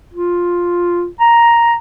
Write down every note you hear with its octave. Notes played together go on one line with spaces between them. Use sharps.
F4
A#5